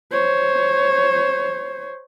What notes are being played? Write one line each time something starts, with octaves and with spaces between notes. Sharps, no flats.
C5 C#5